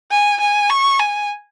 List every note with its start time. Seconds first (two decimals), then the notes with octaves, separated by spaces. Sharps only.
0.11 G#5
0.40 G#5
0.70 C#6
0.99 G#5